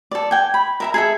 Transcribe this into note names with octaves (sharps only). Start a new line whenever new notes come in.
A4 D5
G5 G#5
B5
A#4 E5 A#5
G#4 A4 E5